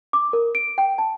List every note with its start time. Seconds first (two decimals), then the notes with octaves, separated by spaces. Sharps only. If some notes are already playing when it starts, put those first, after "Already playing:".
0.13 D6
0.33 A#4
0.55 D7
0.78 G5
0.98 A5